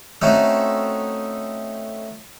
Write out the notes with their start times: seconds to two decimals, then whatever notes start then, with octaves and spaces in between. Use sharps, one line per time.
0.21 A3 C4 C#4 D#4 F#4 A4